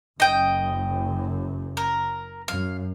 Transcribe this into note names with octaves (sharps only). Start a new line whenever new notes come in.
F#1 F#2 D#5 G5
A#4
F#2 F5